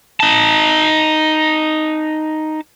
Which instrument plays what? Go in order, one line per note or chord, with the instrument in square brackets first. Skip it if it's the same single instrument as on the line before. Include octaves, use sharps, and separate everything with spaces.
[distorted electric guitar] D#4 A5